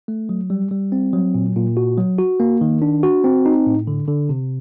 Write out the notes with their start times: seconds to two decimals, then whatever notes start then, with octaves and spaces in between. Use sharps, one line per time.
0.08 A3
0.29 F#3
0.50 G3
0.71 G3
0.92 C4
1.13 F#3
1.34 A#2
1.56 A#2
1.77 F#4
1.98 F#3
2.19 F#4
2.40 A#3
2.61 D#3
2.82 D4
3.03 F#4
3.24 C4
3.46 D#4
3.66 A2
3.87 D3
4.08 D3
4.29 C3